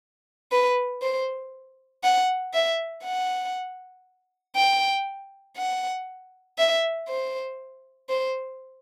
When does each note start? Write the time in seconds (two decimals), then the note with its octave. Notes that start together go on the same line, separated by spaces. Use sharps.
0.52 B4
1.02 C5
2.03 F#5
2.54 E5
3.05 F#5
4.56 G5
5.57 F#5
6.58 E5
7.08 C5
8.09 C5